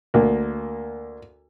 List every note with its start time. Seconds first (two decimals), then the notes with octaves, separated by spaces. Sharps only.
0.14 D2 A#3